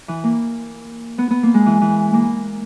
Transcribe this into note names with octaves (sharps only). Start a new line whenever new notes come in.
E3
A#3
B3
B3
A#3
G#3
E3
E3
A#3